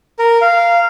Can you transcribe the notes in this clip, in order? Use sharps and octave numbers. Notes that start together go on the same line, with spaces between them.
A#4
F5